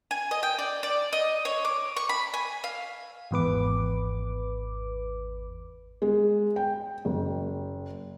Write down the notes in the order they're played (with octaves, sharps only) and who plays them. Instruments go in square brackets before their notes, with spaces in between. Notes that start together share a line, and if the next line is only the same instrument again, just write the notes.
[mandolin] G#5
D#5
G5
D5
D5
D#5
C#5
D6
C#6
B5
G#5
F5
[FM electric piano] G#1 E2 B4 D6
[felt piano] G#3
G5
F#1